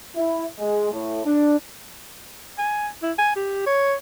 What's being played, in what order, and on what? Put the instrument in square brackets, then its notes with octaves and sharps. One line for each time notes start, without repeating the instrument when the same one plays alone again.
[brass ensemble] E4
G#3
A2
D4
[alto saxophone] G#5
E4
G#5
G4
C#5